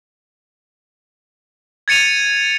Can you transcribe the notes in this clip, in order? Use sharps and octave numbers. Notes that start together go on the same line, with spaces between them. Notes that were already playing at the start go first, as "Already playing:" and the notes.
G#6 A6 C#7 D#7 F7